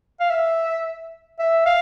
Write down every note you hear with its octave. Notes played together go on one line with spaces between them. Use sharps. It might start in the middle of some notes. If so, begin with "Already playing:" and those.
F5
E5
E5
F5